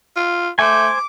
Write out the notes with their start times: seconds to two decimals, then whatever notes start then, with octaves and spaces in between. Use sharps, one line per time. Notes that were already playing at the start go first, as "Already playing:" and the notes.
0.16 F4
0.59 A3 C5 G#5 D6